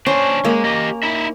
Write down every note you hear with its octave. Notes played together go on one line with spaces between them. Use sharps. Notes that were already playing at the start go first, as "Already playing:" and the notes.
C#4 D4 C5
G#3 A#3
G4 D#5
D#4 E4 E5